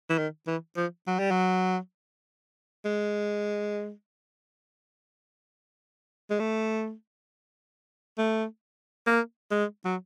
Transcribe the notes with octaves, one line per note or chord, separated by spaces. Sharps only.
E3
D#3
E3
F3
F#3
G3
F#3
G#3
G#3
A3
A3
A#3
G#3
F#3